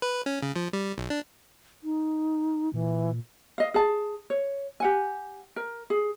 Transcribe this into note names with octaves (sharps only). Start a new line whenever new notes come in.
B4
C#4
C#3
F3
G3
B1
D4
D#4
A#2 E3
D#5 F5
G#4 A5
C#5
G4 F#5 G#5
A#4
G#4